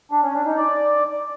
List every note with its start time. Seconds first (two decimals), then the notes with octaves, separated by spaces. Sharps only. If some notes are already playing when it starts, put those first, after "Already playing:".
0.11 D4
0.23 C#4
0.34 D4
0.46 D#4
0.57 D5